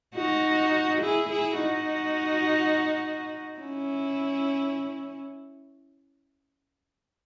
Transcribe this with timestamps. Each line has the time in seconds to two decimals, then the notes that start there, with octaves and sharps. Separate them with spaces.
0.15 D#4 F#4
1.01 E4 G#4
1.30 E4 G#4
1.59 D#4 F#4
3.59 C#4 E4